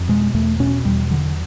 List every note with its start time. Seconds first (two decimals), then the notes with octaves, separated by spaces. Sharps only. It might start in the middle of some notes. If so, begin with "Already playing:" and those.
Already playing: F2
0.08 B2 G#3
0.34 E2 A3
0.59 B2 C#4
0.85 E2 G3
1.10 D3 F#3